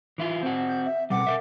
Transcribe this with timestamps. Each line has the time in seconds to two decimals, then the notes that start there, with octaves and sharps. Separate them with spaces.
0.18 E3 E4 F4
0.43 C4 F#4
0.67 G6
0.85 E5
1.10 B2 G3 F#5 D6
1.27 A#4 B4 E5